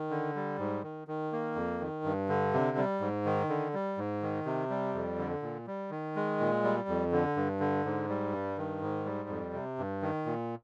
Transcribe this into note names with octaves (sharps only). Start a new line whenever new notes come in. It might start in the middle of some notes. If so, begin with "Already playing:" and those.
Already playing: D#3
D3
G3
G#2
D#3
D#3
A#3
F2
D#3
G2
D3
C3
G3
G#2
D#3
D3
G3
G#2
D#3
C3
G3
F2
D3
A#2
G3
D#3
G#3
A#2
G3
F2
D3
G2
D3
G#2
G3
G2
D#3
G#2
G3
F2
C3
G2
D#3
A#2